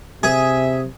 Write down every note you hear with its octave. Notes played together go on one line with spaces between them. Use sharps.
C3 G#4 E5